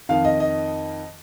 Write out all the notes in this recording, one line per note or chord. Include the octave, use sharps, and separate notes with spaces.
F2 D#3 F5
D#5
D#5